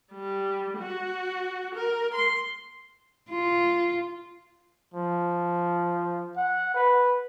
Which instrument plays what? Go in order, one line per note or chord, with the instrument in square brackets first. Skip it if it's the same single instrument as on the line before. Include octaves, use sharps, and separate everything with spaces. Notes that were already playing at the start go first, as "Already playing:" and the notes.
[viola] G3
F#4
A#4
C6
[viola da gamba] F4
[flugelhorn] F3
F#5
B4